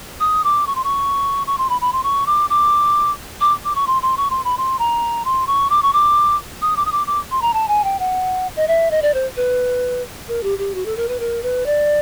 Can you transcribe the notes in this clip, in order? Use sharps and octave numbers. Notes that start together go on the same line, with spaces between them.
D#6
D6
C#6
C6
C#6
C#6
C6
B5
B5
C6
C#6
D6
D6
D6
D6
C#6
C6
C6
C#6
C6
B5
C6
A#5
C6
C#6
D6
C#6
D6
D#6
D6
D#6
D6
D6
C6
A#5
A5
G#5
G5
F#5
D#5
E5
D#5
D5
C5
B4
A#4
G4
G4
F#4
A4
A#4
B4
A#4
B4
D5